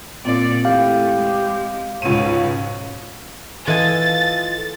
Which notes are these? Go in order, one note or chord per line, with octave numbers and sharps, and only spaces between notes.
A#2 C4 D5
E3 A3 G4 F5
G#3
C#2 G#2 B2 C#5 D#7
E3 F4 A4 D#5 G#5 A6